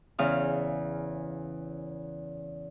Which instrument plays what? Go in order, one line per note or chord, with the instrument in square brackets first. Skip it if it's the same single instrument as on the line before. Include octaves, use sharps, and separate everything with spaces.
[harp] E2 C#3 F5 D#6